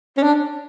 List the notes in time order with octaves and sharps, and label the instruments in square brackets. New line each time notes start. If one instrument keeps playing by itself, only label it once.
[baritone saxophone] C#4
D4